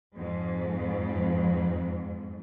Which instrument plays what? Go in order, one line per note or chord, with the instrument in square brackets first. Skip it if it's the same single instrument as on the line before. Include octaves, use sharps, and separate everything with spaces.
[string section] F2 G#2